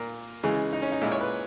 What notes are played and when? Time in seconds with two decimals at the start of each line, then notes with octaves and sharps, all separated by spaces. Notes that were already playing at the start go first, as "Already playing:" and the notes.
Already playing: A#2 A#3
0.43 C#3 E3 G#3
0.73 D#4
0.82 C#4
0.92 D#4
1.01 A#2 G#3 E4
1.12 C#5
1.21 B4